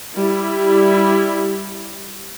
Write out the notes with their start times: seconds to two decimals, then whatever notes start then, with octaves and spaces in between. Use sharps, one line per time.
0.17 G3 E4